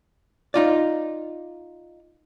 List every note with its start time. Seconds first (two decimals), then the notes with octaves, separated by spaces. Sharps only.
0.54 D#4 F4 D5